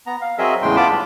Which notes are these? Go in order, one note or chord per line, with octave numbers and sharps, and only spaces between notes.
B3 A#5
F5
F#3 C4 G#4 A#4 D#5 E5
E2 A2 C#3 G#3 G5 C6
B3 F4 A5 B5 D6
G2